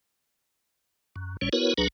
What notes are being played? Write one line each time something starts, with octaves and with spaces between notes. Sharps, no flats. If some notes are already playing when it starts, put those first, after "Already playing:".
F#2
G1 A2 G3 C#4 C#5
B3 E4 F#4 A#4 B4 C#5
C#2 F#3 D4 G#4 B4 A#5